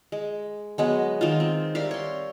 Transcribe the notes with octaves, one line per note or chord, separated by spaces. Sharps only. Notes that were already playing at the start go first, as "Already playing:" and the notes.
G#3
F#3 G#3 B3
D#3 F4
C4
G3 A#4 E5 F5
C#5 C6